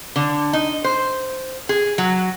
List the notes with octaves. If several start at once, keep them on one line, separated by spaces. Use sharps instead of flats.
D3
D#4
C5
G#4
F#3